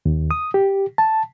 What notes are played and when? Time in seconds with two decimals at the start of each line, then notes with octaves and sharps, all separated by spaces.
0.06 D#2
0.31 D#6
0.54 G4
0.98 A5